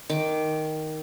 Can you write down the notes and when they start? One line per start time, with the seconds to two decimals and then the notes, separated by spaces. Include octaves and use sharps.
0.09 D#3 D6